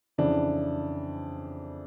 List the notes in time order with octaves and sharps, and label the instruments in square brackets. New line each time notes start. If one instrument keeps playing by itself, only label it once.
[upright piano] F2 C#3 E3 D4